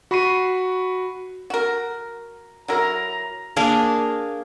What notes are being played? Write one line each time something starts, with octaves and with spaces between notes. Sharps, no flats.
F#4 B5 C#6 C7 D#7
F#4 A#4
F#3 E4 A#4 A#5
A#3 D4 G#4 A#4